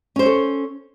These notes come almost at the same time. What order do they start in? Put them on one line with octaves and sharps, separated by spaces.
C#4 C5 C#5 A4